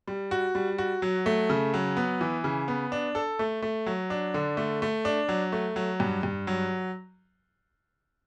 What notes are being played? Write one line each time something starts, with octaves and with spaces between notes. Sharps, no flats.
G3
F#4
G3
F#4
F#3
A3
C#3
F#3
B3
E3
C#3
B3
D4
A4
A3
A3
F#3
D4
D3
A3
A3
D4
F#3
A3
F#3
G2
G2
F#3